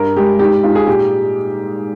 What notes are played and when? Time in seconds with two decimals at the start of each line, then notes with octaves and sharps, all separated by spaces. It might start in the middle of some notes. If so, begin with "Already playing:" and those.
Already playing: G2 A#4
0.16 G#3 G4
0.39 G#2 G4
0.64 G#2 F4
0.75 G#4
0.87 A#2 G4